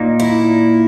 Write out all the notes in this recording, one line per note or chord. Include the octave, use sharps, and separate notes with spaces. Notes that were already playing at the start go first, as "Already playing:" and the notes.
Already playing: A#2 A#3 D#4
E4